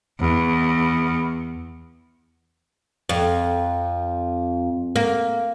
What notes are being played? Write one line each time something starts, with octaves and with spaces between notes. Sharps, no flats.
E2
F2
A#3